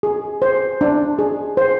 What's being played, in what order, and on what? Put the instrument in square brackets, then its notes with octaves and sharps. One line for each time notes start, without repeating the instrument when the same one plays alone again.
[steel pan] G#4
C5
D4
G#4
C5